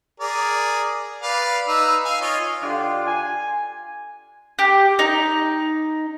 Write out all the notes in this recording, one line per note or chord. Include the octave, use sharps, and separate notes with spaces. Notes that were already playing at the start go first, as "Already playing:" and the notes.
G#4 A#4 D5
B4 D5 F5
D#4 B4 E6
F5 G#5
F4 C#5 D#5
D3 D4 F4 G4 G5 C6
G#5
G4
D#4